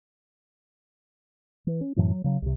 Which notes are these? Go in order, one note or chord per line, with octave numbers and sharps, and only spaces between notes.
E3
C#4
F#2 A2 E3 F#3
F#3
C#3 F#3
C2 C3